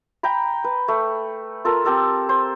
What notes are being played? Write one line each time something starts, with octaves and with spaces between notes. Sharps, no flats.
G5 A#5 B5
B4
A3
F4 A4 A#4
C4 G4 A4 A#4
C5